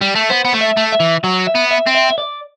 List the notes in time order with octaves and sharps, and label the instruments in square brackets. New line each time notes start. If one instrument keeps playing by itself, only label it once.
[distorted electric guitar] G3
A3
[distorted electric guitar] B3 [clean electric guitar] C5
[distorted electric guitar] B3
A3
[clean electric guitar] E5
[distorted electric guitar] A3
[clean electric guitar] E5
[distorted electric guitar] E3
F#3
[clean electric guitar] E5
[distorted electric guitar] B3
[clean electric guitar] E5
[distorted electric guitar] C4
[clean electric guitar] E5
E5
D5